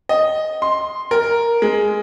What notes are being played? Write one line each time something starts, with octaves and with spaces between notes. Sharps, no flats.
D#5
C6
A#4
G#3